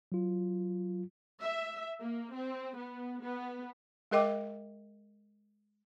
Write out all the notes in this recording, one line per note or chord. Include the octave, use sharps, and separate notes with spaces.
F#3 F4
E5
A#3
C4
B3
B3
G#3 G#4 A#4 D#5 G5 D6